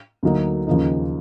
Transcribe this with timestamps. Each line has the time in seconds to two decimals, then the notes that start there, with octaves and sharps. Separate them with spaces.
0.23 D2 D3 F#3 A#3 D#4
0.67 D#2 C#3 F3 A#3 D#4